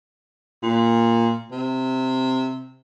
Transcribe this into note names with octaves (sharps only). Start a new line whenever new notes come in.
A#2
C3